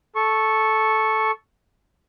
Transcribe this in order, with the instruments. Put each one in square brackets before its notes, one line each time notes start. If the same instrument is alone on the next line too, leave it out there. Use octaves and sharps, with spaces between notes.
[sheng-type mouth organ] A4 C#6